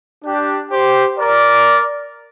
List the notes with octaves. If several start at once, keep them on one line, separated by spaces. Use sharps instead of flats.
D4 G4
G4 C5
A#4 D5